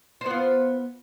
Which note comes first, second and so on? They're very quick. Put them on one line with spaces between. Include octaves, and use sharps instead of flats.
C5 B3 F4